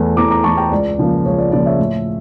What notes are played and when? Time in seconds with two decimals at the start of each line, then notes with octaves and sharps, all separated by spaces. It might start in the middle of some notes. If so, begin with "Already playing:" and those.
Already playing: E2 E3 A3
0.17 E2 A#5 D6
0.31 A#5 D6
0.44 E3 A3 A5 C#6
0.57 G5 A#5
0.72 C#2 D5
0.98 C#3 F3 A#3
1.25 C#2 C#5
1.38 D5
1.52 C#3 F3 A#3 D5
1.66 C#5 E5
1.79 A2